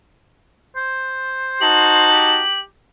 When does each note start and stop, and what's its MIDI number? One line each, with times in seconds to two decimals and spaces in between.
0.76 2.12 72
1.61 2.42 63
1.61 2.42 66
1.61 2.42 81
1.61 2.59 102
2.12 2.62 67